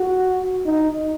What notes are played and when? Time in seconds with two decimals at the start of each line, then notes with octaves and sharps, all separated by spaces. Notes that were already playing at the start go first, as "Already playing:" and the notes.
Already playing: F#4
0.66 D#4